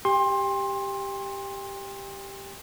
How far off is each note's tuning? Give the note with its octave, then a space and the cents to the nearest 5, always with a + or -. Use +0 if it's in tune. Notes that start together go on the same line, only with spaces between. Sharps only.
G4 +0 G5 +35 C6 +20